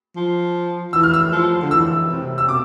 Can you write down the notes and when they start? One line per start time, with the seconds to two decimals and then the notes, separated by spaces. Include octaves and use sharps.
0.16 F3
0.93 E3 E6
1.03 F6
1.14 E6
1.32 F3
1.62 D3
1.71 E3 E6
2.10 C3
2.38 E6
2.49 B2 D6